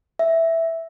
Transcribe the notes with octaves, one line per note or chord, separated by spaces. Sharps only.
E5